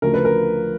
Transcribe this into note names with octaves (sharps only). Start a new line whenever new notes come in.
D2 C#3 F3 A3 A#4
B4
A#4